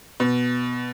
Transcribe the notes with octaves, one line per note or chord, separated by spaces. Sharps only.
B2